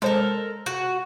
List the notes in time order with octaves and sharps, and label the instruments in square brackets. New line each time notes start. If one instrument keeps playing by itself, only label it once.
[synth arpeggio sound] G#3 C5 [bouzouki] A4 A#4
[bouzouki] F#4